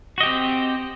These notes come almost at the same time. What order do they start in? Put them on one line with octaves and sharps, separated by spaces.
F#4 D#5 G4 C4